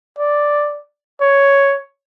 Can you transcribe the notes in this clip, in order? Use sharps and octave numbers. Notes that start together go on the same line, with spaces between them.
D5
C#5